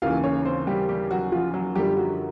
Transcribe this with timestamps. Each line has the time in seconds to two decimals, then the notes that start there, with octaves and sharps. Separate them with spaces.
0.02 D#2 C#3 E3 F4 F5
0.24 C#4 C#5
0.45 C4 C5
0.67 G3 G4
0.89 G3 G4
1.11 F#3 F#4
1.32 F3 F4
1.54 F#3 F#4
1.75 F#2 D3 F3 G3 G4
1.97 F#3 F#4